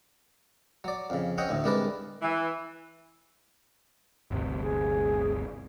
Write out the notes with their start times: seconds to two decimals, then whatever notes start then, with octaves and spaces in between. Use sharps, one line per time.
0.84 F#3 D5
1.10 F2 C#3
1.38 C4 C#4 D#5 F#5 G5
1.49 D2 A2
1.64 C2 G#3 D4 A#4 B4 D5
2.22 E3
4.31 G1 D2 C3
4.61 G#4